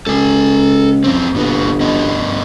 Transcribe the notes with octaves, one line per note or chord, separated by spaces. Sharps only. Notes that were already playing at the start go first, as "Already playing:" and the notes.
C#2 A4 G#5
E2 C4
G1 A#2 B3
G2 B3 D#5